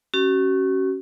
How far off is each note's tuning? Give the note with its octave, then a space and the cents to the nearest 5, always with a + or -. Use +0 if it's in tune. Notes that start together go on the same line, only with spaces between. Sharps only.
C#4 -15 F#4 +40